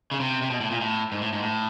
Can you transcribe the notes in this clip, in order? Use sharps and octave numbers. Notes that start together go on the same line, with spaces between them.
C#3
C3
C3
B2
A2
A#2
A2
G#2
A2
G#2
A2